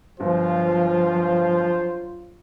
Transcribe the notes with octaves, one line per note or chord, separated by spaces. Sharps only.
G1 F3 F#3 F4 C5